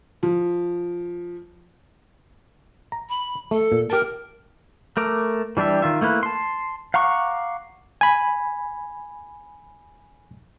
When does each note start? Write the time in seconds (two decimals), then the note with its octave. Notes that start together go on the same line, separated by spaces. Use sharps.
0.23 F3
2.92 A#5
3.09 B5
3.51 A3 A4
3.72 A#2
3.90 G4 A#4 A5
4.97 A3 A#4 D6
5.57 E3 G3 D4 G4 E5
5.82 D#3 F4 E5
6.01 A3 A#3 E4 B4
6.23 A5 C6
6.94 F5 F#5 A#5 C#6 D6
8.01 G#5 B5